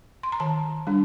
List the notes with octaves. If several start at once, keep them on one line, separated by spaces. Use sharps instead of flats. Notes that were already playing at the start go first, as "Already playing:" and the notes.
C6
A#5
D#3 A5
G3 D4